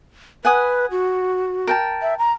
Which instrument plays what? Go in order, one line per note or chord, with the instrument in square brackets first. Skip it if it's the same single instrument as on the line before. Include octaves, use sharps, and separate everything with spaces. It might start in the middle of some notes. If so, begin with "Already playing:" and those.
[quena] B4 [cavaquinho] F#5 G#5 D#6
[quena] F#4
[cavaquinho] A#4 G5 A5
[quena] E5
A#5